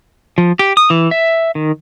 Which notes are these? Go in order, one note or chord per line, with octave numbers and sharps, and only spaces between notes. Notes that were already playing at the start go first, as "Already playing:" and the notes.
F3
G4
D#6
E3
E5
D#3